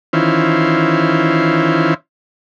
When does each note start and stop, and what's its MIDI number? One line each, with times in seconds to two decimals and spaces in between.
0.13 1.94 51
0.13 1.94 52
0.13 1.94 61
0.13 1.94 64
0.13 1.94 65
0.13 1.94 72